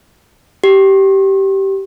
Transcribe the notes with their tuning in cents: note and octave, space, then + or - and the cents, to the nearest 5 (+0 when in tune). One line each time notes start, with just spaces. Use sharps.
G4 -15